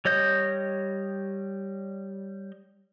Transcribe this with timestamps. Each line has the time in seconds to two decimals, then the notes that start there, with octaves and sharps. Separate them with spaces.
0.05 G3 C#5 D#5 G6